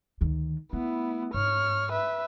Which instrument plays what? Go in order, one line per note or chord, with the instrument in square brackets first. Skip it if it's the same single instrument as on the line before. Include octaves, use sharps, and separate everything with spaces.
[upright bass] D2 D#3
[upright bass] A3 [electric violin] B3 E4
[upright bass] G#2 [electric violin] C#5 F6
[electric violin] B4 E5